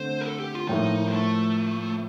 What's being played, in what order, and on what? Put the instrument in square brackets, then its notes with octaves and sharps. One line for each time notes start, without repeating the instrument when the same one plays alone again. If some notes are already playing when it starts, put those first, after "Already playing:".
Already playing: [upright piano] D3 A3 C4 [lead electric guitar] C5
[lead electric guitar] A#4
A4
G4
F4
[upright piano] A2 F3 A#3 F4 [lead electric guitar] D#4
[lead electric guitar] G3
A3